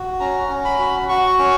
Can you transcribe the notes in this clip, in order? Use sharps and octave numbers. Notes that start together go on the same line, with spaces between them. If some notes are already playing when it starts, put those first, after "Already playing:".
Already playing: F#4
C#4 A#5
C#4
B5
F#4
F#4 C#6
C#4